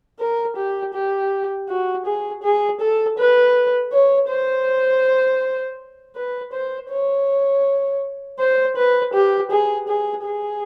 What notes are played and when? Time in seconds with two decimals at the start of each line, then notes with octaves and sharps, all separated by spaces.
0.19 A#4
0.57 G4
0.94 G4
1.69 F#4
2.06 G#4
2.43 G#4
2.80 A4
3.18 B4
3.92 C#5
4.29 C5
6.16 B4
6.53 C5
6.91 C#5
8.39 C5
8.77 B4
9.14 G4
9.51 G#4
9.88 G#4
10.25 G#4